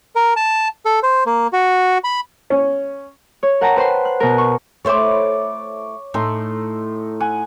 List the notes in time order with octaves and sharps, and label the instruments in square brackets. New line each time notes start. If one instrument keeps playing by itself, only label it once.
[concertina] A#4
A5
A4
C5
A#3
F#4
B5
[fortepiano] C#4
[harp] C#5
A#4 F#5 G5 A5 A#5
B4 C5 F#5 C6
F#6
B2 A#4
C#6
[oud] A3 E4 C5 [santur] C#5 D6
[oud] A2 [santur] D#4 A4 C6
[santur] F#5 G#5